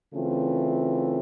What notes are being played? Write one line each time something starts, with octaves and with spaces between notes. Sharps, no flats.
C#3 E3 A3 C4 F4